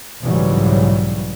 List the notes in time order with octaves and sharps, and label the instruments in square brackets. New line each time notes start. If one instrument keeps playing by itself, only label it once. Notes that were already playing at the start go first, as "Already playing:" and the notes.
[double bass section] B1 G#2 C#3 E3 F#3 G3